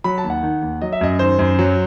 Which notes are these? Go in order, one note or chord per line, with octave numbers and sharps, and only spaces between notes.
F#3 B5
A5
D#2
F#5
D#3
D#2
F#3 D#5
E5
F#2 D#5
D#3 C5
F#2
F#3